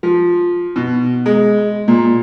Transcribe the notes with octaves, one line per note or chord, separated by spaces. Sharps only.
F3
B2
G#3
A#2